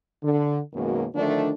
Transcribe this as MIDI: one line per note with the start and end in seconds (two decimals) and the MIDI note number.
0.23 0.58 50
0.73 1.05 42
0.73 1.05 47
0.73 1.05 51
0.73 1.05 54
0.73 1.05 56
0.73 1.05 58
1.15 1.51 50
1.15 1.51 51
1.15 1.51 53
1.15 1.51 57
1.15 1.51 62